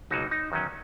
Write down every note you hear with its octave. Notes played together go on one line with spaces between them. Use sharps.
C#2 B2 F#3 A#3 D#4 F#4
D#4
E2 D#3 F#3 C#4